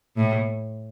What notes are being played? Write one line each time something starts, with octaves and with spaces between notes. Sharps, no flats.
A2